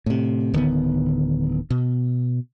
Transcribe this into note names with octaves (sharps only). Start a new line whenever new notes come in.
A2 C3
D1 D3 D#3 B3
B2